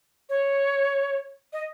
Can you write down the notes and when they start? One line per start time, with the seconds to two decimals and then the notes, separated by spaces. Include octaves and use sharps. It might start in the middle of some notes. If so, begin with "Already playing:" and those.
0.29 C#5
1.53 D#5